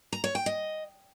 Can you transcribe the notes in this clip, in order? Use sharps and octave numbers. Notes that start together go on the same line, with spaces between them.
A#5
C#5
G5
D#5